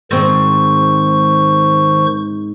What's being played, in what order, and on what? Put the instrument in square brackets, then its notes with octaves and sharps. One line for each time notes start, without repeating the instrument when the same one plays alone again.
[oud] G#2 C4 [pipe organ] D#3 C5 C#6